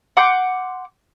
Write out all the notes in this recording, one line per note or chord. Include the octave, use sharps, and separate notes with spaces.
F#5 C6 D6 G6